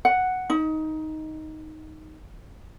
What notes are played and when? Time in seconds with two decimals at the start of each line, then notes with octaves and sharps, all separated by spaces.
0.05 F#5
0.50 D#4